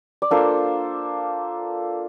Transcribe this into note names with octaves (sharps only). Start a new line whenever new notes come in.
D5
A#3 D4 F4 A4 C5